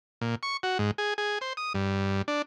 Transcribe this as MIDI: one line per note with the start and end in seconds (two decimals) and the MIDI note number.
0.21 0.35 46
0.43 0.57 85
0.63 0.78 66
0.79 0.91 44
0.98 1.14 68
1.18 1.38 68
1.41 1.53 72
1.57 1.73 87
1.74 2.22 43
2.28 2.42 62